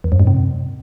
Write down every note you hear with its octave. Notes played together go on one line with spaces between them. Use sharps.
E2
F#2
G#2
C3